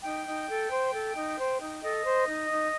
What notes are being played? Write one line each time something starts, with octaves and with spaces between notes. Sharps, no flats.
D#4 G5
D#4
A4
C5
A4
D#4
C5
D#4
A4 D#5
C5
D#4
D#4